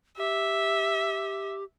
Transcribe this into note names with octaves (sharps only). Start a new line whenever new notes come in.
G4 E5